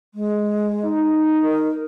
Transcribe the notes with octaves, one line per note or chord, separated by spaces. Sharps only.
G#3
D#4
A#4